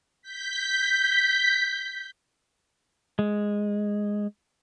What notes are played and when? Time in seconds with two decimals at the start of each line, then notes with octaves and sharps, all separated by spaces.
0.22 G6 B6
3.19 G#3